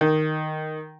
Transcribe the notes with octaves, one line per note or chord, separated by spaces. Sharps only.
D#3